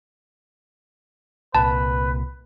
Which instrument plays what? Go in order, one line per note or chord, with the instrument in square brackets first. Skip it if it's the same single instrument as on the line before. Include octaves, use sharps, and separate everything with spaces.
[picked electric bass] C2 A#2 [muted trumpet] B4 [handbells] A5